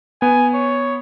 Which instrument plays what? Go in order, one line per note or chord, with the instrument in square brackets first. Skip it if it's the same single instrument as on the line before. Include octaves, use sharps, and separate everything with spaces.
[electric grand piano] B3 [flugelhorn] G#5
[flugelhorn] C#5